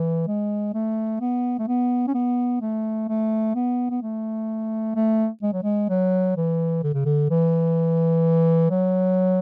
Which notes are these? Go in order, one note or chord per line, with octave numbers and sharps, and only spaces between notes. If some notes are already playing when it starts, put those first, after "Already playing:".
Already playing: E3
G#3
A3
B3
A3
B3
C#4
B3
A3
A3
B3
B3
A3
A3
G#3
F#3
G#3
F#3
E3
D3
C#3
D3
E3
F#3